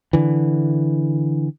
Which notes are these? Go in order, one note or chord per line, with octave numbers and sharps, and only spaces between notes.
D3 E3